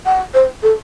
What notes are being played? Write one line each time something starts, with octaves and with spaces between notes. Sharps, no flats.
F#5
C5
A4